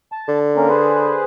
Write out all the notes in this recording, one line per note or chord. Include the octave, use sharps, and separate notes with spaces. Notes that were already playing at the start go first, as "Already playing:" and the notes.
A5
D3
A#3 C#4 A#4
G#4 B4 C5